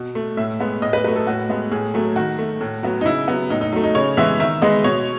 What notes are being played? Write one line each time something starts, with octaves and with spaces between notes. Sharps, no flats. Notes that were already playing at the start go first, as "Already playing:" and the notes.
Already playing: B2
A3
A2 E5
G#3 B3
A2 D#5
B4
F#3 A3 B4
A4
A2 F#4
G#3 B3
A2 G#4
F#3 A3
D#3 F#4
A3
A2
F#3 B3
D#4
C#3 E4
F#3 B3
A2 D#4
D#4
F#3 A3 D#4
D#4
C#3 C#5
E3 G#3 B3 E5
D#3 E5
G#3 B3 D#5
B2 C#5